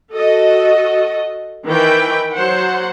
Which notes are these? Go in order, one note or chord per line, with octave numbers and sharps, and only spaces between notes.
F#4 A4 D#5
D#3 E3 B4 G5
F#3 C5 F#5